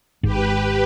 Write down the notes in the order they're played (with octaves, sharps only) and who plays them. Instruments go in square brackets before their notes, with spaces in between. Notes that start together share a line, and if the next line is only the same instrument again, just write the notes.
[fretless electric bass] G#1 G#2 [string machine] G4 B4